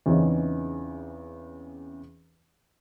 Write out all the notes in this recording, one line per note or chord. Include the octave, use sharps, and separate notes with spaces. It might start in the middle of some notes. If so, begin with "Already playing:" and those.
E2 C#3 E3 C4 C#4 D#4